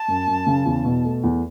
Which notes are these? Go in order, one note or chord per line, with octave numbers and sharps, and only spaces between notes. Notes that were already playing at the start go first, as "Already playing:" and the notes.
Already playing: A5
F#2
F#2
C#3
E2
B2
A3
E2